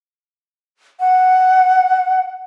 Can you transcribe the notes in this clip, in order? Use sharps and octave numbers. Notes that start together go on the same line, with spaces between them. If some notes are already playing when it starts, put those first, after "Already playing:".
F#5